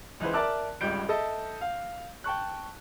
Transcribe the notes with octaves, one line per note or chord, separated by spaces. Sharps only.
C#2 E3 B4 C5
A#4 D5 E5 A5 D6 F#6
G#1 C#2 G3 G6 D7
A4 D#5 E5 A5
F5
G5 A5 C#6 F#6